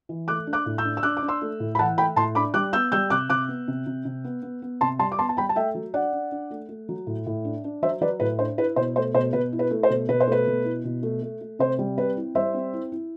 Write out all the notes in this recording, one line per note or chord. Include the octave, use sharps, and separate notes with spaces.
E3
A3 D6 F#6
D4
D6 F#6
A2
E6 G6
D4
E6
D4 D6 F#6
D6
D4
C6 E6
A3
A2
B5
E3 F#5 A5
A3 G5 B5
A2 A5 C6
D4 B5 D6
G3 D6 F#6
B3 E6 G6
G3 E6 G6
C3 D6 F#6
C3 D6 F#6
B3
C3
C3
C3
B3
B3
B3
C3 A5 C6
G3 A5 C6
D6
B3 A5 C6
A5
G3 G5 B5
A5
A3 E5 G5
F#3
D4 D5 F#5
D4
D4
A3
A3
F#3
A2
A2
D4
D4
F#3 C5 E5
F#3 B4 D5
A2 B4
D4 C5
E4 B4
B2 C5
A3 C5
B2 C5
B2 B4
E4
B4
A3
C5
B2
B2 B4
C5
A3 B4
B2
E4
B2
A3
A3
A3
C3 C5
G3
C4 B4
E4
G3 C5 E5
C4
E4
E4